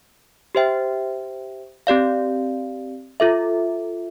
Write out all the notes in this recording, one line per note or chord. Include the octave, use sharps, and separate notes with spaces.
G4 C5 E5 G5
C4 G4 D5 F5
F4 A4 E5